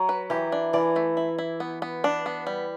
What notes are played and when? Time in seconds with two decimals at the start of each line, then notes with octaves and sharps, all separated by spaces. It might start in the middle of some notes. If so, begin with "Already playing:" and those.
Already playing: F#3
0.09 B4
0.30 E3 G4
0.52 D4
0.73 E3 D5
0.96 A3
1.17 E4
1.39 E4
1.60 B3
1.82 B3
2.04 D4
2.26 B3
2.47 G3